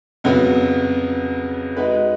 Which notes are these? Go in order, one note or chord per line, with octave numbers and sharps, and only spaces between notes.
F2 C#3 F#3 B3 F#4
G#3 D#4 F#4 B4